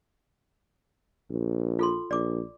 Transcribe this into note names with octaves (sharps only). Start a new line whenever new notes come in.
A#1
F4 A4 C6
A#1 D5 D6